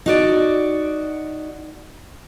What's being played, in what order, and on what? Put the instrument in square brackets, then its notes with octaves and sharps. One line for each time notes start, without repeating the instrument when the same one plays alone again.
[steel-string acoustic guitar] D#4 F#4 D5